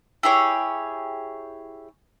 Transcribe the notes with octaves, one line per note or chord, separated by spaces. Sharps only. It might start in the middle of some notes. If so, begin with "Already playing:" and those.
E4 G4 G#4 C#5